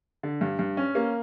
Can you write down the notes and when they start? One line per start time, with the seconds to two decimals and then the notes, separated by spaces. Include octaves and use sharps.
0.23 D3
0.41 G2
0.59 G2
0.77 C#4
0.95 A#3